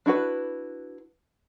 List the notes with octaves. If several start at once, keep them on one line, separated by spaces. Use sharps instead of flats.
D4 E4 F#4 B4